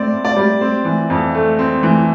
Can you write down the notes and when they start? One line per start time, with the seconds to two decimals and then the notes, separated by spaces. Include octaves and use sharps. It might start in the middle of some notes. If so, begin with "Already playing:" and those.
Already playing: A2 C4 D5
0.12 A2
0.25 D5
0.37 G3
0.61 C4
0.85 E3
1.10 F2
1.35 A3
1.59 C4
1.83 E3